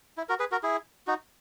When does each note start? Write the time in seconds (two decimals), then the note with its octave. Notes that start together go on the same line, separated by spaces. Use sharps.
0.17 E4
0.29 F#4 A#4
0.40 G#4 B4
0.51 F#4 A#4
0.63 E4 G#4
1.07 D#4 F#4